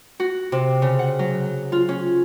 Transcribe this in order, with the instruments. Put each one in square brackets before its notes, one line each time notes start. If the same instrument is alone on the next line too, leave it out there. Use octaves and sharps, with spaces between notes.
[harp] F#4
C3
C#3
F#5
F#3
F4
C#4